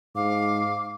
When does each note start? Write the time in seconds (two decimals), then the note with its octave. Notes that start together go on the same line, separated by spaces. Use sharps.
0.16 G#2 F5 D6